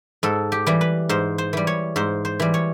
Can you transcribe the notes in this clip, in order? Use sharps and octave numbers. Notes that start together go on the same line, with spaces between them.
G#2 A4
G4
E3 G3
B4
G#2 C5
C5
E3 G3
C#5
G#2 C5
C5
E3 G3
C#5